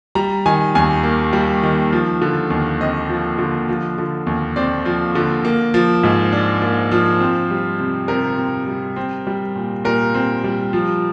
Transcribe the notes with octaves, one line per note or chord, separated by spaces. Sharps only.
G3 A#5
D#3 G#5
D#2 G#5
A#3
G3
D#3
F3
D3
D#2
C4 D#5
F3
D3
F3
D3
D#2
C4 D5
F3
D3
A#3
F3
G#2
D4
A#3
F3
C4
G3
C3
C3 A#4
C4
G3
C4
G3
A#2
A#2 A#4
C4
G3
F3